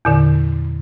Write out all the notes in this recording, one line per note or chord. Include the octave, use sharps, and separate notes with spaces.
E2 A#2 D3